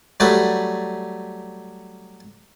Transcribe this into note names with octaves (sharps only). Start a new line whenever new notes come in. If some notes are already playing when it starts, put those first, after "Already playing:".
F#3 G3 A3 B4